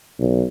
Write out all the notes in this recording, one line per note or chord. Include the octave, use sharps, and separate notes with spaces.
B1